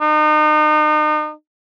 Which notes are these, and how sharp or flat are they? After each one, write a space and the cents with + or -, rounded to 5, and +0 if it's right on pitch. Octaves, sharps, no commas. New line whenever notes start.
D#4 -35